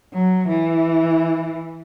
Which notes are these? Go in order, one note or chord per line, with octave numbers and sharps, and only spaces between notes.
F#3
E3